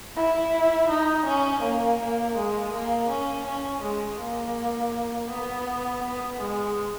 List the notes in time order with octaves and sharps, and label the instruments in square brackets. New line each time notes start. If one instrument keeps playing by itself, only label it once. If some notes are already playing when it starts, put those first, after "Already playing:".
[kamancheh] E4
D#4
C#4
A#3
A#3
G#3
A#3
C#4
C#4
G#3
A#3
B3
B3
G#3